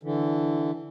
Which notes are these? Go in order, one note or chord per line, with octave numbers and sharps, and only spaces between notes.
D3 E3